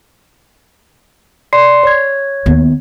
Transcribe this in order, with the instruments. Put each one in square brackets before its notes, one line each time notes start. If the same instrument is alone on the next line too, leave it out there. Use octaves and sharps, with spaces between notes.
[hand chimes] D5 C6 C7
C#5 G#6
[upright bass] D#2 B3